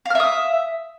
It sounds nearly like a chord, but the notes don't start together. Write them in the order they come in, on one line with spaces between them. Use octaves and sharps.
F5 F6 E5 D#6